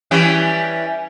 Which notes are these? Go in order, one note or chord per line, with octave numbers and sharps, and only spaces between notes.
E3 G3 C#4